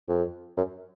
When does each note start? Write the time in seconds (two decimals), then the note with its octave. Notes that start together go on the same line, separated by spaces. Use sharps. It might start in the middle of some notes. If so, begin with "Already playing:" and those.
0.09 F2
0.57 F#2